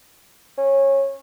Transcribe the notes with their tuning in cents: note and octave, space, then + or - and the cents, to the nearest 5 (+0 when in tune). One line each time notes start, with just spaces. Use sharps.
C#4 -20